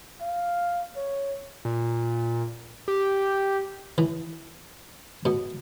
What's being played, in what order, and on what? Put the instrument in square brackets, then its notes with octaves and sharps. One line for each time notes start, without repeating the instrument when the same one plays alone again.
[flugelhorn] F5
C#5
[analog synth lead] A#2
G4
[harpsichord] E3
B2